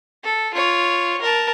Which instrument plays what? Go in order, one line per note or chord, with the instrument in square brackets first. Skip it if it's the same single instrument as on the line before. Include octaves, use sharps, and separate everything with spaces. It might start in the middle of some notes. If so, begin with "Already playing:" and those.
[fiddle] A4
F4 C#5
A#4 A5